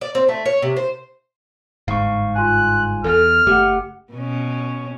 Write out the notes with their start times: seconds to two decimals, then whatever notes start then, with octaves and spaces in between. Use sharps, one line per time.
0.01 D5
0.15 C4
0.29 A3
0.46 C#5
0.62 C3
0.77 C5
1.88 G1 G#2 F5 C#6
2.36 F4 G#5 F#6
3.04 E2 A4 F6
3.47 F#1 A3 G4 F#5
4.13 B2 C#4